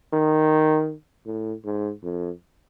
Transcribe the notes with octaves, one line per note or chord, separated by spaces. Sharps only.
D#3
A2
G#2
F2